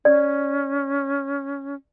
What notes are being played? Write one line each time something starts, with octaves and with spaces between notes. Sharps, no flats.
C#4 D5